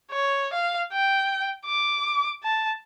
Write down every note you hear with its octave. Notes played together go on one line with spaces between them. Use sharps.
C#5
F5
G5
D6
A5